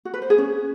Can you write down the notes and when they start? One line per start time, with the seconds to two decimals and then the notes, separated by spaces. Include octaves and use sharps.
0.05 F#4
0.14 B4
0.22 C5
0.30 G#4
0.38 C#4